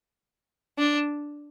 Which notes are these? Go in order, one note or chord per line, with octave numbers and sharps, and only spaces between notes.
D4